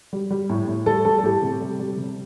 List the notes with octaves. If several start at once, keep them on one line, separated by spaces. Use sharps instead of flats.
G3
G3
A2
A2
G3 A4
G3 A4
A4
A2 G4
C3
G3
G3
C3